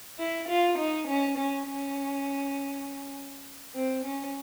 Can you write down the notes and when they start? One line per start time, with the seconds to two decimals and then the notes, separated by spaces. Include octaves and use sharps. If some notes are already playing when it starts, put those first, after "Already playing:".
0.19 E4
0.48 F4
0.78 D#4
1.08 C#4
1.38 C#4
1.68 C#4
3.75 C4
4.05 C#4